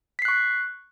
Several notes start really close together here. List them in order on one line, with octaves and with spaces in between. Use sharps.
B6 C7 F#6 C#6